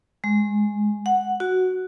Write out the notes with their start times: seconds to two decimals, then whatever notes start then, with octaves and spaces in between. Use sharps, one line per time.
0.24 G#3
1.06 F#5
1.40 F#4